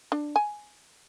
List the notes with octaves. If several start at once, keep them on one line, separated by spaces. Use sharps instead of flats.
D4
G#5